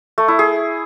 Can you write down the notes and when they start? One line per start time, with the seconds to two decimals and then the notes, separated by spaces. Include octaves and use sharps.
0.18 A3
0.28 E4
0.39 G#4